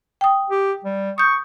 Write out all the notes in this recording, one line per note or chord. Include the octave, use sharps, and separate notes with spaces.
G5 D#6
G4
G3
C#6 D#6 G6